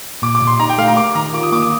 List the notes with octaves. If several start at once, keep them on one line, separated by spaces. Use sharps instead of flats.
A#2 D6
D6
A#2
C6
D#4 A#5
G5
A3 F5
A#5
A#4 D6
D#3 A#5
F4 D6
D#6
A#3 D6
D#6